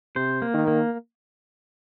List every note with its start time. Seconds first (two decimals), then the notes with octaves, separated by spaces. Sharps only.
0.16 C3 C5
0.42 A#3
0.54 D#3
0.68 A#3